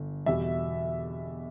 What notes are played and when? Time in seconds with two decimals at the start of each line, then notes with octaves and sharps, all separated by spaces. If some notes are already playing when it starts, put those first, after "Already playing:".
Already playing: G1
0.26 E2 B2 G3 E5